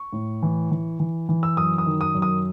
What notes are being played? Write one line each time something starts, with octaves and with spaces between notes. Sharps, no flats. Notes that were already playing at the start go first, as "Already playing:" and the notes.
Already playing: C#6
A2
E3
E3
E3
E3
E6
F#2 D#6
D#6
D#3
D#6
F#2
D#6